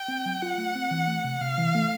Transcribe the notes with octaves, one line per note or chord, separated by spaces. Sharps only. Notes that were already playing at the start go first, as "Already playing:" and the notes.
Already playing: G5
C4
F#3
F4 F#5
A3
C4
E3
A3
C3
C3 F5
E3
A3